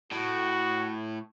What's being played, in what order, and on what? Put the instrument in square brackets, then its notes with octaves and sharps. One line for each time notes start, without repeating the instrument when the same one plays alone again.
[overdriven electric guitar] A2 [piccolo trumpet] F#4